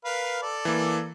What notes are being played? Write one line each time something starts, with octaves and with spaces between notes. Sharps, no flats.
A#4 B4 F5
A4 D5
E3 A#3